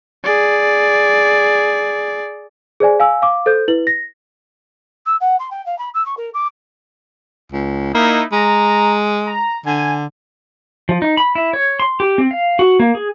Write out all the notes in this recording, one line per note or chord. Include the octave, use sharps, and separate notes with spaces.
G#4 D5
G#4 C5 D5 G#5
F5 G#5 E6
F5 D6
A4 C5 G6
E4 B4 F#7
A#6
E6
F#5
C6
G5
F5
B5
E6
C#6
A#4
D6
C#2
A#3 D#4 E4
G#3 A#5
A#5
D3 G#5
F3
D#4
B5
E4
C#5
C6
G4
C4
F5
F#4
A#3
G#4